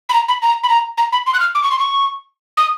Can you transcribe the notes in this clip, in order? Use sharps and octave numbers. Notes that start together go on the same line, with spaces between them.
B5
A#5
B5
A#5
B5
A#5
A#5
B5
C6
F#6
F6
D6
C#6
C6
C#6
D#6